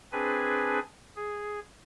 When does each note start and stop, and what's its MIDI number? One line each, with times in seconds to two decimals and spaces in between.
0.12 0.79 60
0.12 0.79 62
0.12 0.79 68
0.12 0.79 71
0.12 0.79 80
1.16 1.59 68